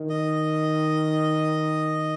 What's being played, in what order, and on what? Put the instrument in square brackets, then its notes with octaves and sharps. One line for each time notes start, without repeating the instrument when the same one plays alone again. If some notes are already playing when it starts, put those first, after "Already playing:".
Already playing: [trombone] D#3
[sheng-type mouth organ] D#5